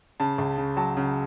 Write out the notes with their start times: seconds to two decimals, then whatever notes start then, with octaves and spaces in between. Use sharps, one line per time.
0.20 C#3 A5
0.38 C#2
0.58 C#3
0.77 F#3 A5
0.97 C#3